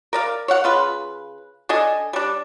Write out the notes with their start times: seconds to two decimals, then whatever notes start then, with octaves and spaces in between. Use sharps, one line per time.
0.13 A#4 D5 F5
0.48 C#5 F5 F#5
0.64 C#3 F4 B4
1.69 D4 A4 D#5 G#5
2.13 G3 D4